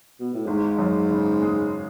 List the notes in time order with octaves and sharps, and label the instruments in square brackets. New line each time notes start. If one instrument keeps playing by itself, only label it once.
[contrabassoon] B2
A2
[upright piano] G#1 [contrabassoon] G#2
[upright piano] F#2
C#3
G#3